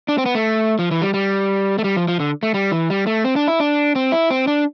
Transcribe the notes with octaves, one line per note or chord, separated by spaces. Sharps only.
D4
C4
B3
A3
F3
E3
G3
G3
A3
G3
F3
F3
D3
A3
G3
E3
G3
A3
C4
D4
E4
D4
C4
E4
C4
D4